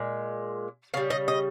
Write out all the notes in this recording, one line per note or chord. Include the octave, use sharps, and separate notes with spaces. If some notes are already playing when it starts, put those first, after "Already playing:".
Already playing: A#2 G#3
C#3 G3 F5
D#5
D#5